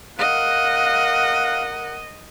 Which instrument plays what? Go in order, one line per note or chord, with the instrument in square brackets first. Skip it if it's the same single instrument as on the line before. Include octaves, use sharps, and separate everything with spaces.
[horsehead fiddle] A#4 F#5 [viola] D#5 [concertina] F5 F#6